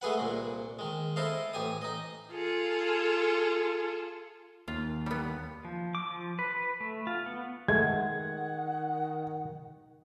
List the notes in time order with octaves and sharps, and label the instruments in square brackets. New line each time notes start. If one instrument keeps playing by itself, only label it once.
[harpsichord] G#3 A3 G#4 B4 F#5
C2 A#2
D#3 G#3
E4 A4 C5 D#5 F5
A1 G4 G#5 D#6
D#4 D#5
[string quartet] F4 G#4 A4
[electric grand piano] D#2 [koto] F4
[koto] G3 B3
[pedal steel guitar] F3
D6
F3
B4
B4
A3
F4
B3
[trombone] D#3 [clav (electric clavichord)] G#3 A3 [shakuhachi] F#5 [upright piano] G#6